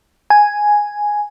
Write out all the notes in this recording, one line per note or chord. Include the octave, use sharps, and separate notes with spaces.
G#5